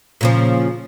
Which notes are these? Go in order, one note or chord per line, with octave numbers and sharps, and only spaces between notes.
A#2 C#3 F3